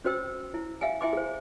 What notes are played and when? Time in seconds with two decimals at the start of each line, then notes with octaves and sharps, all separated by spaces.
0.04 C#4 F#4 C5 G5 E6
0.54 E4
0.81 E5 F5 G5 G#5
1.01 E4 E5 G5 G#5 C6 D6
1.13 G#4 C5